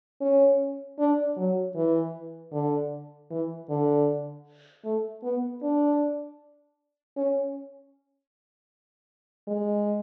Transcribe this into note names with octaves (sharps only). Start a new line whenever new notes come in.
C#4
D4
F#3
E3
D3
E3
D3
A3
B3
D4
C#4
G#3